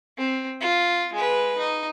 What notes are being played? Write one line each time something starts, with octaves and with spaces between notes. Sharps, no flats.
C4
F4
G#3 B4
D#4